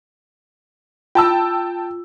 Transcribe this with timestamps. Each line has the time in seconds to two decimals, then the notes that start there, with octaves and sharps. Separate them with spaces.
1.15 F4 G5 A5 E6